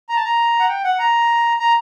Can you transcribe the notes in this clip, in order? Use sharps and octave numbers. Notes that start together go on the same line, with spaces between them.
A#5
A5
A#5
F#5
G5
F#5
A#5
A#5